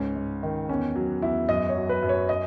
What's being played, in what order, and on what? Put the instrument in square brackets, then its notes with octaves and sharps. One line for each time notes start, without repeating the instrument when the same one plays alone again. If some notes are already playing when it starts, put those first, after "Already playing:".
Already playing: [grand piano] C#2 G#2 C#4
G#2
D#3
E2 C#4
F#3
E2 E4
F#2 D#5
C#5
F#3
B4
F#2
C#5
D#5